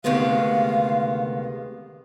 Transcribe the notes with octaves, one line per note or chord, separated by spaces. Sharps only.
D2 C3 D#3 G#3 B3 F5